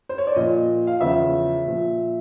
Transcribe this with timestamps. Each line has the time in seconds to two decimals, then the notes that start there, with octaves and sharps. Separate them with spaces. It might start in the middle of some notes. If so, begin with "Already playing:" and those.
0.09 C5
0.18 C#5
0.27 D5
0.36 A#2 F3 D#5
0.87 F5
1.01 E2 C#3 F3 E5
1.66 A#2 F3